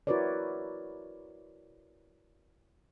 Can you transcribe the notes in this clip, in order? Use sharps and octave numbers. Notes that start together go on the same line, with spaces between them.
E4 F#4 A#4 B4 C#5 D5